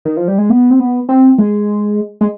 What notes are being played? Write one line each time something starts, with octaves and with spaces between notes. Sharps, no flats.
D#3
F3
G3
G#3
B3
C4
B3
C4
G#3
G#3